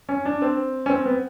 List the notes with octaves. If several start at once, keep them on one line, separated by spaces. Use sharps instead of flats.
C#4
D4
C4
C#4
C4
B3